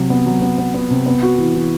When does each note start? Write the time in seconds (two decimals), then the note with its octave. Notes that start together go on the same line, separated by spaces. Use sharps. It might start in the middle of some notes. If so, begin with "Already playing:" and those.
Already playing: C3 F#3
0.10 B3
0.26 F#3
0.42 B3
0.58 B3
0.74 B3
0.90 C3
1.06 B3
1.23 F#4
1.38 E3
1.54 E3